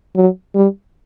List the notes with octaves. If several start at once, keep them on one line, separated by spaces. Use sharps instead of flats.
F#3
G3